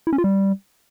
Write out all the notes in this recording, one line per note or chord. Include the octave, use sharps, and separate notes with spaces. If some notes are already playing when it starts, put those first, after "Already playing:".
E4
C#4
F4
G3